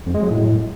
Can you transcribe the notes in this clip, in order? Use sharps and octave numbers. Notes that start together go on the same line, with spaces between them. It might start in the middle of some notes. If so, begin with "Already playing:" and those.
F2
G#3
F#3
A2